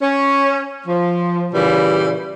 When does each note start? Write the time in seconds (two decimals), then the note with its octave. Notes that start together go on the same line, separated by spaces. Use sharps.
0.02 C#4
0.87 F3
1.53 A#2 C#3 E3 G3